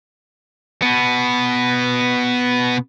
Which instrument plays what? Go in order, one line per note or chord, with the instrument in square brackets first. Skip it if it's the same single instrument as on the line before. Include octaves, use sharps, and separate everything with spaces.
[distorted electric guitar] B2 B3